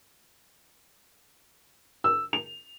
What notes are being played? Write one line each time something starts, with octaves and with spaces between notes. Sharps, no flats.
E6
F7